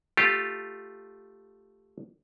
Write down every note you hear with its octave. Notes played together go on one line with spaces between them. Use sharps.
A3 F4 G4